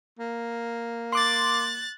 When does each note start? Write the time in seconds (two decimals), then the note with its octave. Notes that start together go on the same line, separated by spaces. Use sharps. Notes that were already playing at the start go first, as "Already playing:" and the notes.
0.19 A#3
1.12 C6 D6 F#6 A6